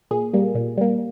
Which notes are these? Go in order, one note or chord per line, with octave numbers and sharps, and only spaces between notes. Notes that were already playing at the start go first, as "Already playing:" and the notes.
A#2 G#4
G3 A#3
A#2
G3 A#3